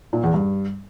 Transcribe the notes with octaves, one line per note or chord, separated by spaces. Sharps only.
A#2
E2
G2